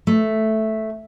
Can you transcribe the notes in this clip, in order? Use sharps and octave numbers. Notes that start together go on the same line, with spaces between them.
A3